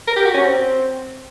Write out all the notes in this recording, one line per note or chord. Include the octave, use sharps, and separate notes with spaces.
A#4
G4
F#4
C#4
C4